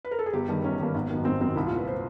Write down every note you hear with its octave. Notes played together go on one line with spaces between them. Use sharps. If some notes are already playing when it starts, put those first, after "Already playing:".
B4
A#4
A4
G#4
G1 G4
G2 D#3
G1 C#4
G2 D#3 A#3
G#1 B3
F#2 D#3
G#1 C4
F#2 C4
D#3
C2 E4
F4
A#2
B4
C5